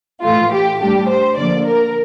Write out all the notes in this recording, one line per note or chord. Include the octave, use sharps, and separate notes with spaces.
A2 E3 A3 F4
G4
A2 G3 D4 G4
C5
D3 F3 A#3 D5
A#4